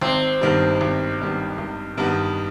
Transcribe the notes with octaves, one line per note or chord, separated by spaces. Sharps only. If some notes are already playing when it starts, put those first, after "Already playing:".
G#1 C4
G2 D#3 G3 B3
G#1
G2 D#3 G3 B3
G#1
G2 D#3 G3 B3